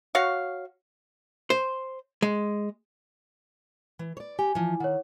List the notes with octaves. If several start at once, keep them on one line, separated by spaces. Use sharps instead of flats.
F#4 C#5 F5
C5
G#3
E3
C#5 D5
G4 G#5
E3 F3
D#3 C#5 F#5